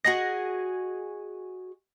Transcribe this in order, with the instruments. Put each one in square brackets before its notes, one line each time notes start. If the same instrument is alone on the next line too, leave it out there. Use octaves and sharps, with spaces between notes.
[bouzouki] F#4 G#4 D#5 [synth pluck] A#6